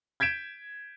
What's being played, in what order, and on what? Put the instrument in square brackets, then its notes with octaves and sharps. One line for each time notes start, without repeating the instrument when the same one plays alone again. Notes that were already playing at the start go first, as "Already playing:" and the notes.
[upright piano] G6 G#6 B6 D7 E7